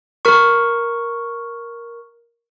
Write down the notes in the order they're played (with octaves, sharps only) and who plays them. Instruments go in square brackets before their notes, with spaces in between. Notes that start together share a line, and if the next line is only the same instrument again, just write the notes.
[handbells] A#4 C#6